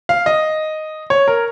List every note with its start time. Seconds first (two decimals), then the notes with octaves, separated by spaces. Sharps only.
0.09 F5
0.26 D#5
1.10 C#5
1.28 A#4